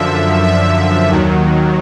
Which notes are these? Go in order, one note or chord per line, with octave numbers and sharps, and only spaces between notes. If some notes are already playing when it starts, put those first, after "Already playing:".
Already playing: F#2 D3 F3 E5
E5
D#2 D#3 F#3